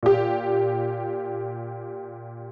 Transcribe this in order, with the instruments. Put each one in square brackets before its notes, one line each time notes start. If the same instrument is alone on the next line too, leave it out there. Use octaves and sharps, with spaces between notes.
[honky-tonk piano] A#2 G4